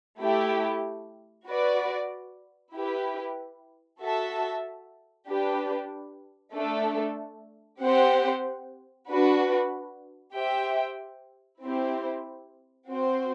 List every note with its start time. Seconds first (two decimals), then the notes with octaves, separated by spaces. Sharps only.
0.21 A3 E4 G4
1.48 F#4 B4 D5
2.74 E4 G4 B4
4.01 F#4 A4 E5 A5
5.29 D4 G4 B4
6.55 A3 D4 A4
7.82 C4 G4 C5 F#5
9.09 D4 F#4 B4
10.35 G4 C5 E5 G5
11.62 C4 E4 G4 C5
12.89 C4 F#4 C5